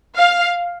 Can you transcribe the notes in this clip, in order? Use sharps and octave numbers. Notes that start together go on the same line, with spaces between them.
F5